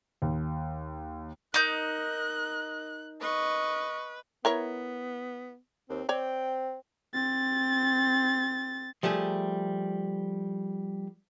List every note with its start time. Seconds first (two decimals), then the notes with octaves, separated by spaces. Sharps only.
0.22 D#2
1.54 D#4 A#4 D#5 F#6 G6
3.21 B4 D#5 C#6
4.45 B3 E4 A#4 C#5
5.90 D#2 C4
6.09 C4 C#5 D5 G5
7.14 C4 A6
9.03 F3 G3 A3 G#4